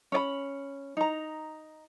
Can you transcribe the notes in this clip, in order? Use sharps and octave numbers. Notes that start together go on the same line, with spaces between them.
C#4 D5 B5
D#4 A#5